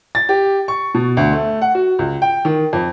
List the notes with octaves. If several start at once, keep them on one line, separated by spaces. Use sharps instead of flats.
A6
G4
C#6
B2
D2
A3
F#5
F#4
C#2
G5
D#3
F2